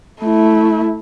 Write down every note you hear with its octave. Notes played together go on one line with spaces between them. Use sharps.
A3 E4